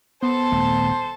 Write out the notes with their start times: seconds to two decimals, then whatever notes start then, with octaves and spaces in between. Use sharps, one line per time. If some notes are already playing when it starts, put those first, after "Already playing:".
0.23 B3 A4 C5 A5
0.52 D#1 A3